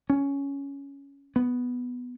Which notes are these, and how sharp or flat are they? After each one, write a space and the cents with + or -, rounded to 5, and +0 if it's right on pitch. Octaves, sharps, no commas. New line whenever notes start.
C#4 +10
B3 +0